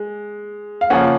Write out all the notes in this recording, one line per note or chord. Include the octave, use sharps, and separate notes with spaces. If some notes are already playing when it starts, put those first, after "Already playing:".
Already playing: G#3
F5
C#3 F3 A#3 C#4 F#5